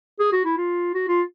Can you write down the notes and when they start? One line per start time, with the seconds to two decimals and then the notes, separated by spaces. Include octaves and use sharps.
0.19 G#4
0.32 F#4
0.45 E4
0.57 F4
0.94 F#4
1.08 F4